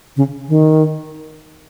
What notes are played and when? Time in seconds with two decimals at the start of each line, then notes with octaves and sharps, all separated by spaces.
0.16 C#3
0.49 D#3